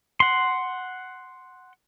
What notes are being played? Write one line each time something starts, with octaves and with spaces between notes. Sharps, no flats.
F#5 C6